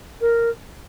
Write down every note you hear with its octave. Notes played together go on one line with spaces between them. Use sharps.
A#4